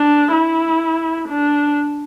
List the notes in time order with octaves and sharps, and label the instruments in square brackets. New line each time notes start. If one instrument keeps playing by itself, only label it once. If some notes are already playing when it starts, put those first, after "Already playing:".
Already playing: [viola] D4
E4
D4